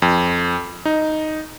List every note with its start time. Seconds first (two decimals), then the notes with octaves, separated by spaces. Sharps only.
0.02 F2
0.85 D#4